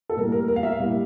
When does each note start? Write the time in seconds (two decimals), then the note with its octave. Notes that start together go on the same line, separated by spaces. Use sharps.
0.10 A4
0.17 A2 G3 A#3 A#4
0.32 A#4
0.48 A#4
0.56 F5
0.63 E5
0.79 A2 G3 A#3